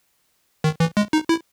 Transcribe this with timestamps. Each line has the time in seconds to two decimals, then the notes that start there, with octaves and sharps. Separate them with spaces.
0.64 D#3
0.80 E3
0.97 G#3
1.13 D#4
1.29 E4